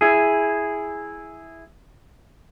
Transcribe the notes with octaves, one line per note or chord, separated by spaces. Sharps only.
E4 G#4